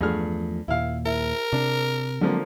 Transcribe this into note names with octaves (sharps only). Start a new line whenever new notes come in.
E2 G2 F3 A3 G#4 F6
D#2 A#2 E4 F5
E4 A#4
C3 D4
D3 F3 F#3 G#3 A#3 C4